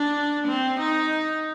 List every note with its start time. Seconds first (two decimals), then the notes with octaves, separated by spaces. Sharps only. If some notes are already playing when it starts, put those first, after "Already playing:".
Already playing: D4
0.47 C4
0.79 D#4